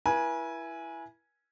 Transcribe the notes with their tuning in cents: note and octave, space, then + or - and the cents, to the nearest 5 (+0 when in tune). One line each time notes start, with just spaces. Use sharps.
E4 +15 B4 -40 G#5 +0